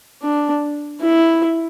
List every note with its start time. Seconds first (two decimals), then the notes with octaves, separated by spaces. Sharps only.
0.23 D4
1.01 E4